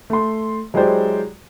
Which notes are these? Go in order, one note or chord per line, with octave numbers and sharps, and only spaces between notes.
A3 C6
F#3 G#3 E4 G4 C5 D5